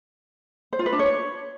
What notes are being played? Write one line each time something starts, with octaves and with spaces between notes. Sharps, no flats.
C5
F4
B4
D4
C#5